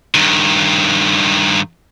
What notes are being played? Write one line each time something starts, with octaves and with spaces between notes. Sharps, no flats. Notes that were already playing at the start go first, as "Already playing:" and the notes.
G2 D#3